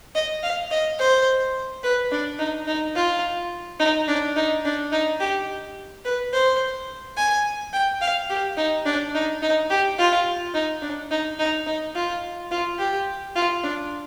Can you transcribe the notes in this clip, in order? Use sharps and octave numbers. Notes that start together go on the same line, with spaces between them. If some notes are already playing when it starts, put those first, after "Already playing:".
D#5
F5
D#5
C5
B4
D4
D#4
D#4
F4
D#4
D4
D#4
D4
D#4
G4
B4
C5
G#5
G5
F5
G4
D#4
D4
D#4
D#4
G4
F4
D#4
D4
D#4
D#4
D#4
F4
F4
G4
F4
D4